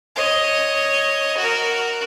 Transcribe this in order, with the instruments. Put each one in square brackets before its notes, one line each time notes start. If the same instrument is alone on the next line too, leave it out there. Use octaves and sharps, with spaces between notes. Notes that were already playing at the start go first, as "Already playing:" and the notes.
[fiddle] C#5 D#5
F#4 A#4